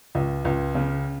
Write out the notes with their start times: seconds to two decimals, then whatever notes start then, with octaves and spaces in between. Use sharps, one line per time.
0.15 C#2
0.45 C#2
0.75 C#3